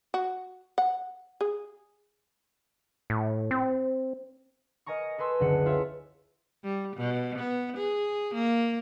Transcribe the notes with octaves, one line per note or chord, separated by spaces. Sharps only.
F#4
F#5
G#4
A2
C4
A#4 D#5 G#5 A#5 C#6
A4 B4 G#5 C6 E6
F#1 C#2 D3 F#5 C#7
E4 F4 B4 C#5 E5
G3
B2
B3
G#4
A#3